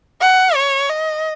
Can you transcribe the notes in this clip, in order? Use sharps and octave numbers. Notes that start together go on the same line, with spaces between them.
F#5
C#5
D#5